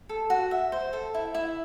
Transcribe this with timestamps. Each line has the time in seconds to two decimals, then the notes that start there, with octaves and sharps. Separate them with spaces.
0.09 A4
0.30 F#4
0.51 E5
0.72 C5
0.93 A4
1.14 E4
1.35 E4